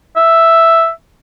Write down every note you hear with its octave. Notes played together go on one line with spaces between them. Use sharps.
E5